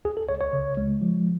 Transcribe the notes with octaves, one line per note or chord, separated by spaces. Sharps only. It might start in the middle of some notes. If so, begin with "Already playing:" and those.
C#2 G#4
A4
C#2 C#5
C#5
C#3
G#3
F3